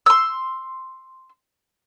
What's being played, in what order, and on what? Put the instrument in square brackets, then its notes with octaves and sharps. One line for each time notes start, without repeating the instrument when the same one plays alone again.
[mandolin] C6 E6